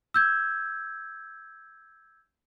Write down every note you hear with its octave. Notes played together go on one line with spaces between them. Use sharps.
E6 G6 G#6